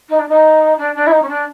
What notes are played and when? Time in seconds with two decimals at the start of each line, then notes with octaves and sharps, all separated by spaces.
0.09 D#4
0.19 D4
0.28 D#4
0.78 D4
0.95 D4
1.07 E4
1.11 D#4
1.22 C#4
1.29 D4